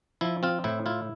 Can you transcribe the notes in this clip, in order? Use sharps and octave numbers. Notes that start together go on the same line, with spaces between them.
F3 E4
C4 F4
A2 E4
E4 F4